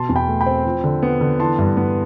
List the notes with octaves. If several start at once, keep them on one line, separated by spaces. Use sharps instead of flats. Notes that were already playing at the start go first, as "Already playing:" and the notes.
Already playing: B2 A5 C6
E2
G5 B5
A3
G5 B5
C4
F3
D3
B3
D3
E3 A5 C6
G2
B3